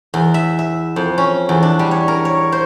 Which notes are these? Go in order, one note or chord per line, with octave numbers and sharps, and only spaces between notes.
E2
E5
E5
F2
C#4
E2
D4
G3
C#5
A#4
C#5
C5